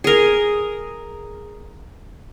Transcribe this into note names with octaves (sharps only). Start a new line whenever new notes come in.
G#4 A#4